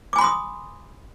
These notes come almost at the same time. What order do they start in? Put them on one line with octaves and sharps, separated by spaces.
D6 G#5 B5 C6 D#6